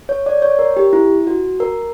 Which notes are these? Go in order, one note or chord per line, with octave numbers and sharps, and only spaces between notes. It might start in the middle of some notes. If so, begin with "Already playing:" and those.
C#5
D5
C#5
A#4
G4
E4
F#4
A#4